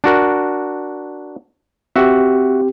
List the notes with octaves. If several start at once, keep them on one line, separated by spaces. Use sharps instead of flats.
D4 F#4 A#4
C4 F#4 G4 E5